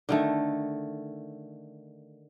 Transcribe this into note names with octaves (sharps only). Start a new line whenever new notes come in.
D3 D#3 A3